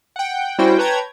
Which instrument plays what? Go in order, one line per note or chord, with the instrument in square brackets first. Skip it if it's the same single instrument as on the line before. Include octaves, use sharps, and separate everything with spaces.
[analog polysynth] F#5 G5
G3 C#4 E4 F#4 C5 G5
B4 C#5 G5 A5 A#5 G#6